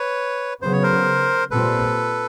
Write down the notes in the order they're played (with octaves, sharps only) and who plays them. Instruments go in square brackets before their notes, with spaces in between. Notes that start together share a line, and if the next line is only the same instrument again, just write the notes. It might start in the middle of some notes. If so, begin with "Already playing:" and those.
Already playing: [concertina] B4 C#5
[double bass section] C#3 F#3 B3 [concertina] C5
[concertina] C#5
A#4 C5
[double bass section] A#2 G3 C4 [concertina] A4 B4